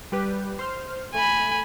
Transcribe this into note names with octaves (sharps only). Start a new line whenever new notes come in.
G3 G4 B4
C5 C6 F6
A3 G#5 B5